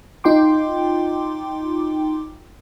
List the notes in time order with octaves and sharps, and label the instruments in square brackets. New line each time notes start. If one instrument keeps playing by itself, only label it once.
[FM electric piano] D#4 F4 G5 C6 D6